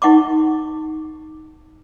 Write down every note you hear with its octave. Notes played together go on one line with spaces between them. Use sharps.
D#4 F#5 C#6 D6